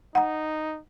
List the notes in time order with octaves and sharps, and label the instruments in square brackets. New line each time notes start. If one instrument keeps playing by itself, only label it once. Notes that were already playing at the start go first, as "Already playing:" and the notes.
[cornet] D#4 [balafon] F#5 A#5